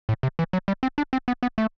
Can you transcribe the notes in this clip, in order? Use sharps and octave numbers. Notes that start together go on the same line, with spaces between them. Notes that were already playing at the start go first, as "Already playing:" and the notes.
A2
C3
E3
F#3
G3
C4
D4
C4
B3
B3
A3